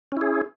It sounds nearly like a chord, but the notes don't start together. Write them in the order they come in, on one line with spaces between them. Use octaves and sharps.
C#4 E4 G#4